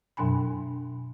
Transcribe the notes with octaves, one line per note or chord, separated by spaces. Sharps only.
F#2 B2 F#3 D4 G#5 B5